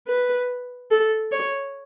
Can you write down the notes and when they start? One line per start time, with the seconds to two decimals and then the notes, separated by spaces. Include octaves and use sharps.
0.08 B4
0.91 A4
1.32 C#5